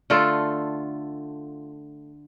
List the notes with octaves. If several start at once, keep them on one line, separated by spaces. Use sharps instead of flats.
D3 A3 F4 A4